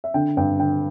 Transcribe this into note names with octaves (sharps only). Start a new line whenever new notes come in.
E5
D3 G5
G2 G5
D3 G5